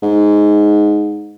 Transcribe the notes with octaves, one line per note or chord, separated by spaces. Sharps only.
G#2